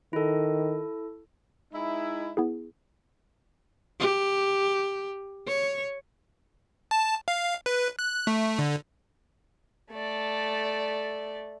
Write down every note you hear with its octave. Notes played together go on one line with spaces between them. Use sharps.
D#3 E4 A4
G#3 D#4 E4
B3 E4 G#4
G4
C#5
A5
F5
B4
F#6
A3
D3
A3 D5